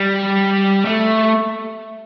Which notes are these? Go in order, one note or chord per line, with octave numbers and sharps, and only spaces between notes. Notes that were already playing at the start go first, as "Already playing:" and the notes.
Already playing: G3
A3